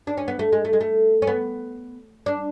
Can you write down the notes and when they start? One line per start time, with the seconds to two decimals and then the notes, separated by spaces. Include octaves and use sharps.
0.07 D4
0.17 C#4
0.28 B3
0.39 A3
0.53 G#3
0.65 A3
0.73 G#3
0.81 A3
1.22 C#4
1.27 B3
2.26 D4